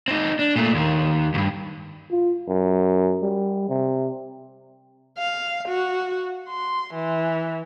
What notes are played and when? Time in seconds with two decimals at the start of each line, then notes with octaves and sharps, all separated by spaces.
0.08 C4 D#4
0.39 D4
0.56 A#2 A3
0.75 D#2 D#3
1.34 C#2 G2
2.11 F4
2.48 F#2
3.22 G3
3.69 C3
5.18 F5
5.68 F#4
6.48 C6
6.94 E3